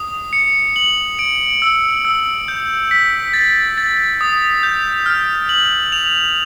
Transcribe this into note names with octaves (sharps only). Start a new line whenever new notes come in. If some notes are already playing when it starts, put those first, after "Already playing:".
Already playing: D#6
C#7
F#7
D7
E6
E6
G6
B6
A6
A6
D#6
G6
F6
F#7
F7